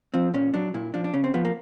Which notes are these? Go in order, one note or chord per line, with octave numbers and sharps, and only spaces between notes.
F3 C4
A#2 C#4
F#3 D4
A#2 E4
F3 D4
D4
C#3 C#4
C4
F3 B3
A#3